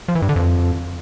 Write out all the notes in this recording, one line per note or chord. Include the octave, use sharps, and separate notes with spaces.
F3
E3
G2
D3
F2